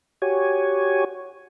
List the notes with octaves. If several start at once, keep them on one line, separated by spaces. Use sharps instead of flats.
F#4 G4 C#5 G#5